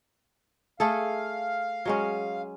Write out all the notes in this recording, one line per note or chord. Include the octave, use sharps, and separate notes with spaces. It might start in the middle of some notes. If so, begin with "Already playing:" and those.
A3 G#4 A4 F5
F#3 G#3 C#4